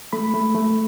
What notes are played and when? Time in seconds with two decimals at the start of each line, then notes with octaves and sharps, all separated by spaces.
0.13 A3 B5
0.34 A3
0.55 A3